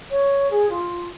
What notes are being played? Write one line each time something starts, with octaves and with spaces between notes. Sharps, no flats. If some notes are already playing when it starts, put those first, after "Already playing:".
C#5
G#4
F4